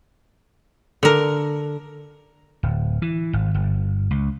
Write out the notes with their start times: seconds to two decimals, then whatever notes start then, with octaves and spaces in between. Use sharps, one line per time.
1.03 D3 A#4
2.63 D1
3.02 E3
3.33 G#1
3.55 G1
4.11 C#2